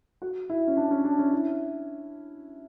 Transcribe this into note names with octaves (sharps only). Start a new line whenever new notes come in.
F#4
E4
C#4
D4
C#4
D4
C#4
E4